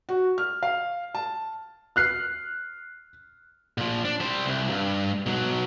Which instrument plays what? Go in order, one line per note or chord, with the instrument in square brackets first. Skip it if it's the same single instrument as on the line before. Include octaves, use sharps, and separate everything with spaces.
[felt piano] F#4
F6
F5
A5
[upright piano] F6 F#6 C7
[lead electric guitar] A#2 F3
D4
G3 C5
C2
G2
B2 F#3